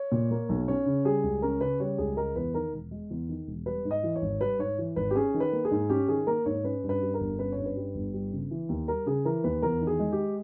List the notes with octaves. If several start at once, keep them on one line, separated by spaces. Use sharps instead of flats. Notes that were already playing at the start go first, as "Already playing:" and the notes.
Already playing: C#5
A#2
A#3
B1
C#4 C#5
C#3
G3 G#4
C#2
C#4 A#4
C#3 B4
G3 C#5
C#2 G#4
G#3 A#4
E2 B4
D#3 A#4
E1
G#3
E2
D#3
E1
G3 B4
G#2
D#5
E3
C#5
G#1
G3 B4
G#2 C#5
E3
G#1 B4
G4
C#4 G#4
D#3
B4
A#3
G#4
G#2
C#4 G4
D#3 G#4
A#3 A#4
G#2 C#5
C#4 B4
G2
B4
G3
A#4
G1
C#4 B4
C#5
G2
B4
G3
G1
G3
C#3
E3
D#2
G3 A#4
C#3 G#4
E3 A#4
D#2 B4
E2 A#4
D#3
G#4
G#3
G4